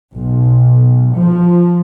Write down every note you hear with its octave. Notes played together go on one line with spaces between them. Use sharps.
B1
F3